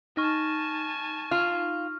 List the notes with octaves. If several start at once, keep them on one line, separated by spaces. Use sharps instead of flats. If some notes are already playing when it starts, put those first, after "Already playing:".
D#4 G#5 A5 C#6 F6 A#6
F4 F6